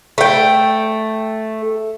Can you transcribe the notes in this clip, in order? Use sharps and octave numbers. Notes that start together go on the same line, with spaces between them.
A3 G5